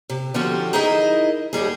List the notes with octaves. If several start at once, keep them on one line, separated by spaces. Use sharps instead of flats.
C3
D3 F3 C#4 E4 F#4 G4
D#4 E4 G#4 A#4 D#5 E5
D#2 D3 G3 G#4